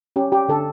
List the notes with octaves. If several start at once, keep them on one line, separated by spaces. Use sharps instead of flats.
C#4 G4
G4
D3 A4